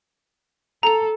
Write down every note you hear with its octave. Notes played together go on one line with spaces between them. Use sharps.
A4 A#5 F7